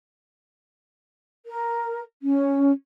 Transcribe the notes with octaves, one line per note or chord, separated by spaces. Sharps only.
A#4
C#4